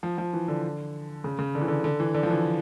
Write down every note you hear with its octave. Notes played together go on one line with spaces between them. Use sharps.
F3
F3
E3
D3
C#3
C#3
D3
E3
D3
D3
E3
D3
F3
E3